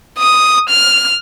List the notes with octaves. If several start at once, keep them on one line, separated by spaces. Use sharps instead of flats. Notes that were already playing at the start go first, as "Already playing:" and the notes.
D#6
F6